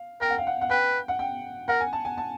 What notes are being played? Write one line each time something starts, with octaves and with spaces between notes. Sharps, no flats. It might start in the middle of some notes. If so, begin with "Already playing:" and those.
Already playing: F5
A#4 G5
F#5
F5
F#5
F#5
B4 G5
F#5
G5
A#4 F#5
G#5
A5
G#5
A5